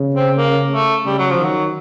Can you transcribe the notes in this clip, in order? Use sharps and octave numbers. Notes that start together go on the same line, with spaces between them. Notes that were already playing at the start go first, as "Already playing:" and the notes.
Already playing: C#3
C4
A#3
A3
C#3 G3
F#3
F3
D#3 F#3